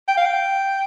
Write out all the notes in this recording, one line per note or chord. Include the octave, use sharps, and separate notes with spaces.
G5
F5
G5